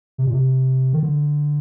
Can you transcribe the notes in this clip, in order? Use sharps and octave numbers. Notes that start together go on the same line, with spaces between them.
C3
A#2
C3
D#3
D3